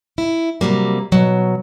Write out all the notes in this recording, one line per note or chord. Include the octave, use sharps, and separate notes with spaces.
E4
C3 F#3 G3 A#3
B2 F#3